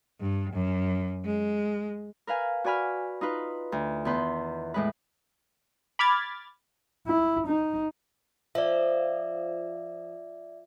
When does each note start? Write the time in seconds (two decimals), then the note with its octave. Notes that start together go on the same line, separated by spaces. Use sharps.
0.20 G2
0.53 F#2
1.25 G#3
2.27 A#4 B4 F5 G#5
2.64 F#4 D5 G#5 B5 F6
3.21 D#4 F4 B4
3.72 D2
4.05 E2 D#3 B4 C6 G6
4.74 A2 G#3 B4
5.99 B5 D6 F6 G#6 A6
7.08 E4
7.48 D#4
8.55 F3 D5 E5